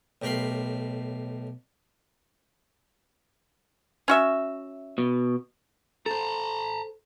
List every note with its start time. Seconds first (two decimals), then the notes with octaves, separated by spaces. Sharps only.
0.22 B1 A2 G4 A#4 B5 C6
4.08 C#4 F#4 E5
4.98 B2
6.06 A4 C5 A5 A#5